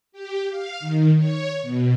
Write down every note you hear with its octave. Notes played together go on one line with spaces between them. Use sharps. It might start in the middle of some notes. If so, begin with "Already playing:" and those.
G4
F5
D#3
C#5
B2